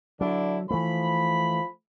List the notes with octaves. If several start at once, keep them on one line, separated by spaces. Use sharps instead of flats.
D3 F#3 D4 E4
E3 F3 A3 B5